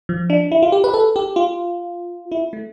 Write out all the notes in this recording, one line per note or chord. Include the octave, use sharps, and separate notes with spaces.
F3
D4
E4
F4
G4
B4
A4
G4
F4
E4
A3